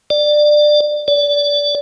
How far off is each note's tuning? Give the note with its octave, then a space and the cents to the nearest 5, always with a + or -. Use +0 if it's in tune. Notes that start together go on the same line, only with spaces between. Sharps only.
D5 +20
D5 -25